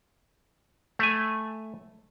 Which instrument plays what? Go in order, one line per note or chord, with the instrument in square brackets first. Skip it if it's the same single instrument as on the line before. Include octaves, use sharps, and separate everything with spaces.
[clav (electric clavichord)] A3 G#5